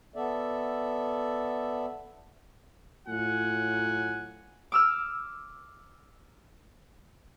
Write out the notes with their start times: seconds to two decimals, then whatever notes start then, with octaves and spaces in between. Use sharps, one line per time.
0.16 B3 A4 D5 E5
3.08 A2 F#3 F4 F#5 G#5
4.72 D6 E6 F6